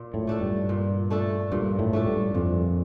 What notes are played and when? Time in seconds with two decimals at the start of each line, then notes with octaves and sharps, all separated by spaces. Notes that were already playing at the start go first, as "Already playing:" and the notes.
Already playing: A#2
0.14 A2
0.27 A3 D4 A4
0.41 G2
0.69 A#2
1.10 A3 D4 A4
1.52 G2 A#2
1.79 A2
1.93 A3 D4 A4
2.07 G2
2.34 F2 A#2